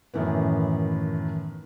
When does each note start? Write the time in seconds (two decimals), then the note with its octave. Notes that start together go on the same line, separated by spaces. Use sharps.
0.14 F#2 A2 D#3 E3 B3